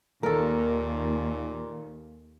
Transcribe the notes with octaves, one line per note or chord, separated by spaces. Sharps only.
D#2 A#2 A4 A#4